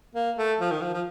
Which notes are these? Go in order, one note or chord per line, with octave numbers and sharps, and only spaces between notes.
A#3
A3
F3
D#3
F3
F3